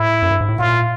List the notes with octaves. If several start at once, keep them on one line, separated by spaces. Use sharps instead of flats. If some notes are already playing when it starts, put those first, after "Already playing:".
Already playing: A2 E4
F#2
G2
G#2
A2
A#2 F4